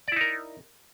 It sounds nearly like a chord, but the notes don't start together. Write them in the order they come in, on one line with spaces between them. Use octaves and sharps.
D5 E4 D#4 A#4